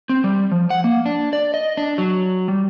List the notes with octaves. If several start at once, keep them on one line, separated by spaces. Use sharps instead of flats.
C4
G3
F3
F#5
A#3
D4
D5
D#5
D4
F#3
G3